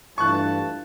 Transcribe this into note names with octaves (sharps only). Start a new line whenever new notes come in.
G2 E3 A3 F4 A5 C#6 F#6